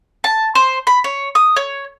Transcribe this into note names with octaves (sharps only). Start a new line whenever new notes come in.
A5
C5
B5
C#5
D#6
C#5